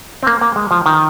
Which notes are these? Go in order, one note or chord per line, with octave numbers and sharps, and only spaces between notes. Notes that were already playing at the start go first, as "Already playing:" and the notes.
C4
A#3
A#3
G#3
F3
D#3